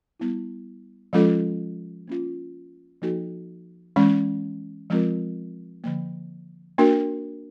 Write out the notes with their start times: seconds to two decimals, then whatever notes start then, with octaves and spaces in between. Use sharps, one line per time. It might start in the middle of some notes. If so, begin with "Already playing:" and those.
0.20 G3 B3 E4
1.13 F3 G#3 C#4 F4 A4
2.08 A#3 C#4 F4
3.02 F3 A#3 D#4 F#4 A4
3.96 E3 G#3 C#4
4.90 F3 G#3 C4 F4 A#4
5.84 D3 F3 A#3
6.78 A#3 D4 F#4 A#4